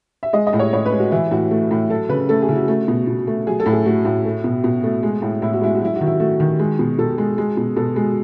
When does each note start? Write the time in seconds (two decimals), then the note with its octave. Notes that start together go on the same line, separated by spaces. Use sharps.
0.23 E5
0.33 G#3 D#5
0.47 D#5
0.53 A2
0.59 C#5
0.73 A2 C#5
0.86 B4
0.92 G#3
0.99 F#4
1.11 E3 E4
1.31 A2 F#4
1.51 A3
1.71 A2
1.90 F#3 A4
2.09 C#3 B4
2.29 A3 A4
2.42 G#4
2.49 C#3 E4
2.55 F#4
2.68 A3
2.88 B2
3.07 B2
3.27 A3
3.47 F#3 G#4
3.60 A4
3.66 A2
3.72 G#4
3.86 A3 F#4
4.05 A2
4.25 A3
4.44 B2
4.64 B2
4.84 A3
5.03 G#3
5.22 A2
5.42 A2 E4
5.53 F#4
5.62 G#3 E4
5.75 F#4
5.81 F#3 E4
5.96 D#3 F#4
6.06 E4
6.20 A3 F#4
6.40 D#3
6.59 G#3
6.79 B2
6.99 B2 A4
7.18 G#3
7.38 G#3
7.57 B2
7.76 B2 A4
7.96 G#3